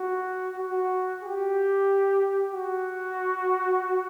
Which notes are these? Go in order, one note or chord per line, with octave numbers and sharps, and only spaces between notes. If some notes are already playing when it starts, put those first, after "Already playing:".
Already playing: F#4
F#4
G4
F#4